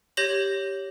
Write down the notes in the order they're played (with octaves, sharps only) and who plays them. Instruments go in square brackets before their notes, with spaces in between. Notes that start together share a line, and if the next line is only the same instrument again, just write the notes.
[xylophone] G4 C#5 G6 A#6 F#7